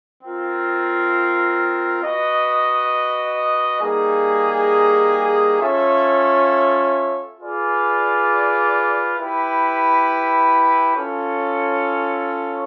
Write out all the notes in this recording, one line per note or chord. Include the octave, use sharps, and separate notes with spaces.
C4 F4 A#4
F#4 B4 D#5
G3 A#3 D#4 G#4
C#4 F4 A4 C#5 E5
F4 G#4 B4 D5
E4 G4 B4
C#4 F4 A4 C#5